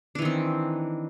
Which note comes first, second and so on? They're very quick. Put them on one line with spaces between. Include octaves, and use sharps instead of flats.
D4 E3 D#3 C4